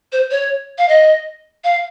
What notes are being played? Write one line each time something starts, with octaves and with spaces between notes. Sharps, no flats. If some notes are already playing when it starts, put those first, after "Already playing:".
C5
C#5
F5
D#5
F5